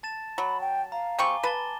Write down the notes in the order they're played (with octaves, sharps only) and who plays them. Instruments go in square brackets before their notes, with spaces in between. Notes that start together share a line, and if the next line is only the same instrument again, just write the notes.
[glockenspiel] A5 A6 E7
[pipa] F#3 [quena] B5
[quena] G5
[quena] F5 [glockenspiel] A#5
[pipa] G3 C4 C#6 [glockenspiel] G#5 D6 G7
[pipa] B4 [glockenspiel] A5 A6 G7